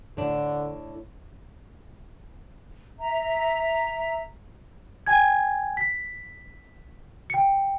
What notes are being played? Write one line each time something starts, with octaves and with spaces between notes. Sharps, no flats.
A2 D3 D4
E5 A#5
G5 G#5 G#6
B6
G5 C#7